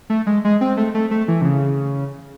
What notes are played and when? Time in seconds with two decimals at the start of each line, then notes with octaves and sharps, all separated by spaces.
0.10 A3
0.27 G#3
0.45 G#3
0.61 C4
0.77 A3
0.94 A3
1.11 A3
1.28 E3
1.41 C3
1.45 C#3